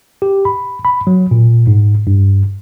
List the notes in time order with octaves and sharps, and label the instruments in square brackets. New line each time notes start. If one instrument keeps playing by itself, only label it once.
[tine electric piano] G4
B5
B5
F#3
A#2
G#2
G2